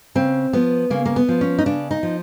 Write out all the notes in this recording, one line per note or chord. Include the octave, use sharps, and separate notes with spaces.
C#3 C4
F3 B3
C#3 A#3
A#3
B3
F3
C#4
D#4
C#3 D4
D#4
F3